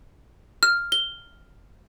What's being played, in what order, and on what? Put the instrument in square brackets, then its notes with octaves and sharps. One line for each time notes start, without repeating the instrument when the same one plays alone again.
[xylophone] F6
G7